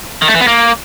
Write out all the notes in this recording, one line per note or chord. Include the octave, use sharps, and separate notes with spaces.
D#3
A3
E3
B3
A#3